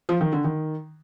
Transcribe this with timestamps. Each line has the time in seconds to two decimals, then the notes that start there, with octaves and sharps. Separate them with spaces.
0.09 F3
0.21 D#3
0.32 D3
0.44 D#3